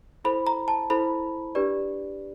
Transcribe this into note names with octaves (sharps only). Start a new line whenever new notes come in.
E4 A4 C5 B5
A#5
A5
E4 A4 C5 B5
D4 G4 B4 D5